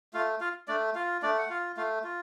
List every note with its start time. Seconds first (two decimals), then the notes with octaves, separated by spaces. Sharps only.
0.14 A3 F4 F5
0.40 F4 F5
0.68 A3 D4 D5
0.95 F4 F5
1.22 A3 D4 D5
1.38 F#5
1.50 F4 F5
1.77 A3 F4 F5
2.04 F4